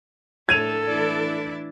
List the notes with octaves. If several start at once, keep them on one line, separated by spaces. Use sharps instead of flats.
A2 A3 D4 A4 G#6 D#7 F7
E3 D4 E4 D5